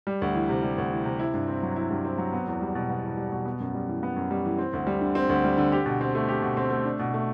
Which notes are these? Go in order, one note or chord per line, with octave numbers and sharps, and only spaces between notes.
G3
D2
E3
C3
G3
D2
E3
C3
E4
G2
C4
F#3
E4
G2
C4
F#3
B3
E2
G3
B2
B3
E2
G3
B2
B3
F#2
G3
E3
B3
F#2
G3
E3
C4
D2
G3
D3
C4
D2
G3
D3
G4
B2
C4
A3
G4
B2
C4
A3
D4
B2
A3